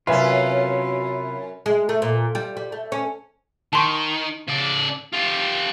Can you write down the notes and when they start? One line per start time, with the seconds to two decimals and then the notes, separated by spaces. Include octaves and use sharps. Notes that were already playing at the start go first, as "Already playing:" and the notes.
0.07 F#2 C3 C#4 F4 B4 E5 G#5
1.66 G#3
1.89 A3
2.02 A#2
2.35 G3
2.57 G3
2.72 A3
2.92 C#4
3.73 D#3 A5 C6 C#6
4.48 C#3 D5
5.13 F4 G4